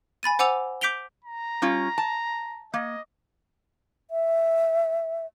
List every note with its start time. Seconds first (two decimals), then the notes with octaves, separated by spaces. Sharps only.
0.23 G#5 B5 A6 D#7
0.39 C5 F#5 G#5 D6 E6 F7
0.81 D6 G6 B6 D7 F7 G7
1.25 A#5
1.62 G3 C#4 F4
1.98 A5
2.74 A#3 D#5
4.11 E5